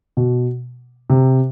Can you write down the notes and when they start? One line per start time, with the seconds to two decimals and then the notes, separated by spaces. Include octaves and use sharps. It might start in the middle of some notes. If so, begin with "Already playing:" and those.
0.17 B2
1.10 C3